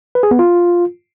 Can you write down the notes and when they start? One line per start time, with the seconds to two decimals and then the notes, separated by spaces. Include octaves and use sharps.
0.15 B4
0.23 G#4
0.31 B3
0.39 F4